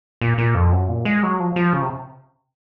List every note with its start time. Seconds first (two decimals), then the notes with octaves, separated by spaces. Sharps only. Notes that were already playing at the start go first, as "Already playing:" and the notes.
0.21 A#2
0.38 A#2
0.55 F2
0.72 F#2
0.88 A#2
1.05 G#3
1.23 F#3
1.40 F3
1.56 F3
1.73 C#3
1.82 C3